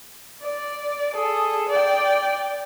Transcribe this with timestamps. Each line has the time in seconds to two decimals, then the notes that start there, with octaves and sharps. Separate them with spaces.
0.42 D5
1.13 G#4 A4
1.69 D5 G5